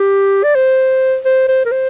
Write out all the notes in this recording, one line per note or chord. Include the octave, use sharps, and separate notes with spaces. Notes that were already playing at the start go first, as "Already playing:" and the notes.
Already playing: G4
D5
C5
C5
C5
A#4
C5